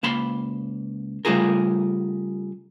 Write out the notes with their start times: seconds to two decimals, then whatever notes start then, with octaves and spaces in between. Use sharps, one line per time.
0.03 C#2 A#3 A5 B5 C6
1.25 C#3 G3 A3 F4 G#4 A#4